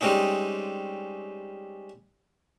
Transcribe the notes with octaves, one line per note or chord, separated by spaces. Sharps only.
G3 G#3 C4 C#4 D#4